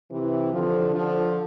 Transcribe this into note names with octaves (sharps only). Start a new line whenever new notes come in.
C3 E3
D3 F3
D3 F3